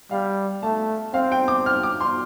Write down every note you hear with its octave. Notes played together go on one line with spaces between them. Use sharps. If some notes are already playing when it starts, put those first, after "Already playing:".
G3 F5
A3 A5
C4 F5
G5
D6
F6
D6
C6